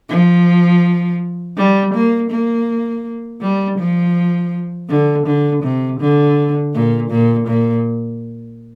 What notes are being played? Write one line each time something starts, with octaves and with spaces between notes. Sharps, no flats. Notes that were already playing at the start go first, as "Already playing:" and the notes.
F3
G3
A#3
A#3
G3
F3
D3
D3
C3
D3
A#2
A#2
A#2